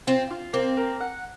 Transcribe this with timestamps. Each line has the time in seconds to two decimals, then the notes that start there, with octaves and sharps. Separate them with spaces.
0.07 C4 F4
0.31 F4
0.53 A#3 C4
0.77 A#3
1.01 F#5